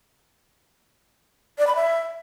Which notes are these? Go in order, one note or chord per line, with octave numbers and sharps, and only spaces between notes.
D5
B5
E5